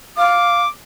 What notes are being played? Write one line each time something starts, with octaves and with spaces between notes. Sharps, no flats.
F5 D6